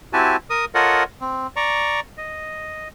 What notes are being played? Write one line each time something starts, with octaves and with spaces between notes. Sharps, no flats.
C4 E4 F#4 G4 G#5 A5
A#4 D#6
F4 A4 A#4 C#5 D#5 F#5
C4
D5 A#5 C#6
D#5